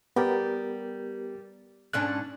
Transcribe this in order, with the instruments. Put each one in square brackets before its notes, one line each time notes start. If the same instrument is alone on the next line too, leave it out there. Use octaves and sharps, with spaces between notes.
[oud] G3 [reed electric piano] B3 G4 A#4
[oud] G#2 C#4 D4 [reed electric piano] F#6